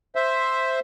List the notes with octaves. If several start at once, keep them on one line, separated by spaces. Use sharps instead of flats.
C5 E5